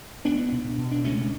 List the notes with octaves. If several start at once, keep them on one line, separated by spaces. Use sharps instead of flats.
C#2 B3 D4
B2
B2
D4
C#2 A3 C#4